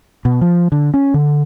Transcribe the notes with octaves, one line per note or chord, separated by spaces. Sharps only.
B2
F3
D3
C#4
D3